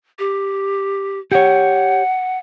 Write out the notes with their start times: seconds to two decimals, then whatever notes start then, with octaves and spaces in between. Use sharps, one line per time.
0.19 G4
1.32 G4 C#5 F#5